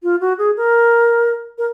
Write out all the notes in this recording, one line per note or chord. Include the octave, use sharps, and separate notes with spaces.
F4
F#4
G#4
A#4
A#4